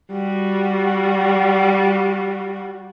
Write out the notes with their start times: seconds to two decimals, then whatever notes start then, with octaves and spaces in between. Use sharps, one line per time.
0.12 G3 F#4